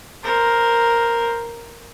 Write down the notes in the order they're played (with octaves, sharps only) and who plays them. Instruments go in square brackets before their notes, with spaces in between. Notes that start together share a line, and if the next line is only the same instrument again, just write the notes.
[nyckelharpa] A#4 C5